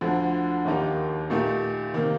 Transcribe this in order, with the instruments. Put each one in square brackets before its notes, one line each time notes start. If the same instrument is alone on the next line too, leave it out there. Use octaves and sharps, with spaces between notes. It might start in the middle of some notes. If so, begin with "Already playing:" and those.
[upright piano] D2 D3 F3
D#2 D#3 A#3 D#4 G4
A#2 A3 D#4 G4
C3 D#3 A#3